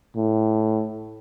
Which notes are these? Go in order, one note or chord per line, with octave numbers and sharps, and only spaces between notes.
A2